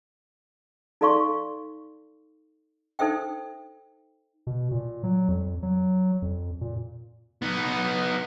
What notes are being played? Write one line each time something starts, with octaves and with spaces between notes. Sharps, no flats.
D#4 A4 D5 F5 C6 C#6
D#4 A4 C5 E5 G5
B2
A#2
F#3
F2
F#3
F2
A#2
B3 D#4